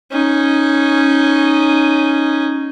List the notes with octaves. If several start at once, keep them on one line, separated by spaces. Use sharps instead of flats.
C#4 D#4